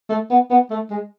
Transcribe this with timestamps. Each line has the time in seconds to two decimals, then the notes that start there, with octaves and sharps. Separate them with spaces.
0.09 A3
0.30 B3
0.50 B3
0.70 A3
0.90 G#3